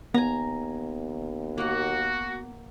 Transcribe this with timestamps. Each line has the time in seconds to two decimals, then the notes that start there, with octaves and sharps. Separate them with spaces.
0.14 D#2 B3 G#5 A#5
1.58 A#3 F#4 F#5